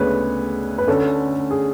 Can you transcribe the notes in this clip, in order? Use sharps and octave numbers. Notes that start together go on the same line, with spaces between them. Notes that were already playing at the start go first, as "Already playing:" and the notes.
Already playing: D2 C#3 G#3 B3 D4 B4 C#5
B4
D2 D3 A3 C#4 A4
G#4